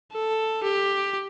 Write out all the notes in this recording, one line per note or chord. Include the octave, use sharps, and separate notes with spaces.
A4
G4